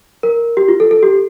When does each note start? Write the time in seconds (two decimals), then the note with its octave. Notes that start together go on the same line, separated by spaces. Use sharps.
0.23 A#4
0.57 G4
0.68 F4
0.80 A4
0.91 A4
1.03 G4